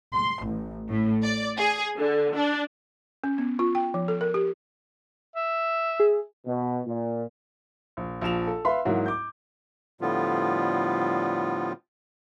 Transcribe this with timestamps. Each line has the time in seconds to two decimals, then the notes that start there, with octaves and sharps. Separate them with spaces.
0.14 C6
0.45 A1
0.89 A2
1.23 D5
1.58 G#4
1.97 D3
2.35 D4
3.24 C#4
3.38 B3
3.59 F4
3.75 G5
3.94 F3
4.08 A4
4.21 A#4
4.34 G4
5.36 E5
6.00 G#4
6.46 B2
6.86 A#2
7.97 A#1
8.21 A#1 F3 E7 F7
8.47 A4
8.65 B4 E5 F5 B5 C6
8.85 G#2 E3 F#3 A#3 E4
9.06 D6 G6
10.01 A2 D3 F3 G3 B3 F4